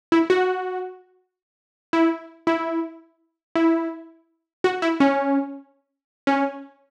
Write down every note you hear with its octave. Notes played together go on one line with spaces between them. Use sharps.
E4
F#4
E4
E4
E4
F#4
E4
C#4
C#4